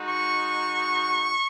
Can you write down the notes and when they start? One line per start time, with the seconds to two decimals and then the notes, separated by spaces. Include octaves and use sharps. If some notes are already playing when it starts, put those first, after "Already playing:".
Already playing: G#3 D#4 F#4
0.09 C#6